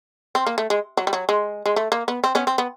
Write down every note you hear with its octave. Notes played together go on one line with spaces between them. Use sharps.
C4
A#3
A3
G#3
F#3
G3
F#3
G#3
G#3
A3
A#3
B3
C4
B3 C#4
C4
B3